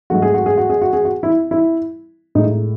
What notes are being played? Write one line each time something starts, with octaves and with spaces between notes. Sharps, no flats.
G#2 F#3 A3 F#4
G#4
F#4
G#4
F#4
G#4
F#4
G#4
F#4
E4
E4
A2 G#3 D#4